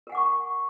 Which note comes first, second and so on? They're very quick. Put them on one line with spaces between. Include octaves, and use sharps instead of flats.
A#4 G#5 F#5 D6 C#6